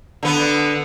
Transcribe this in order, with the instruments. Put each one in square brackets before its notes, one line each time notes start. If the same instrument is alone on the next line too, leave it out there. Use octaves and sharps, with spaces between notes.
[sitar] D3 B3